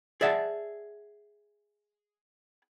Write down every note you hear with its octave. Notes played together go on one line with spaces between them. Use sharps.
G#4 D5 E5 F#5 A5